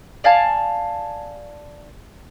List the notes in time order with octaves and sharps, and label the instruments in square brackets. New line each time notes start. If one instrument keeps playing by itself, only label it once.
[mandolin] D5 F5 G#5 A5